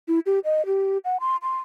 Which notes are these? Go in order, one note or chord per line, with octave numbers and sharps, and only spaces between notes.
E4
G4
D#5
G4
F#5
C6
C6